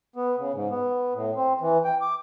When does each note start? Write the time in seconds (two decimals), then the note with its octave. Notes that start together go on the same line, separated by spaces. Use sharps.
0.16 B3
0.38 C#3
0.55 G#2
0.70 B3
1.14 A2
1.35 C4
1.61 E3
1.85 G5
2.01 D6